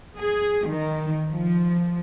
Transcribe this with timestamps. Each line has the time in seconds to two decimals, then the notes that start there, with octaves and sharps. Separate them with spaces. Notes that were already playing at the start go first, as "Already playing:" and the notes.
0.16 G#4
0.69 D#3
1.30 F3